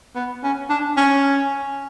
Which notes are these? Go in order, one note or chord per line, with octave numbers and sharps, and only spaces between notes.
B3
C#4
D4
C#4